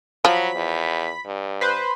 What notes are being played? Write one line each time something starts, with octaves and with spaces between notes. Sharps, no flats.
F3 F#3 B5
E2
G2
B4 C5